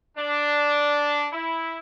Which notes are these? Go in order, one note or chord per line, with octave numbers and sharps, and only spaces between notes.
D4
E4